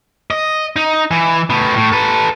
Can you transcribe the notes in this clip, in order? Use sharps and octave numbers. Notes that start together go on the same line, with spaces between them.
D#5
D#4
E3
A2 B3
A2
A4 B4